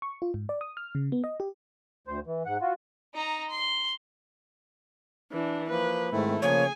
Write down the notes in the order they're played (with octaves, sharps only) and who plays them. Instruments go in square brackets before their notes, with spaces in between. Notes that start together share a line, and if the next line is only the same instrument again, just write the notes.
[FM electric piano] C#6
F4
G#2
D5
D#6
F6
C#3
B3
D#5
G4
[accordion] D2 C5
E3
G#2 F#5
F4 F#4
[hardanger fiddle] D#4 A#5
C6
[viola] E3 D4
[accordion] F3 A#3 [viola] B4
[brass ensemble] G#2 C4 [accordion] D#3 E4 [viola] A3
[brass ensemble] C#3 F3 A#3 [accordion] G#4 [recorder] C#5 [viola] G#5